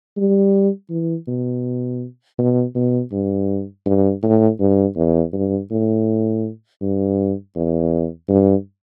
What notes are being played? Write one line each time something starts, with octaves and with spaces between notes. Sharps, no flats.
G3
E3
B2
B2
B2
G2
G2
A2
G2
E2
G2
A2
G2
E2
G2